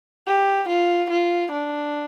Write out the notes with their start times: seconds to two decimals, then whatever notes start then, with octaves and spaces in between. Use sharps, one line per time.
0.27 G4
0.69 F4
1.10 F4
1.52 D4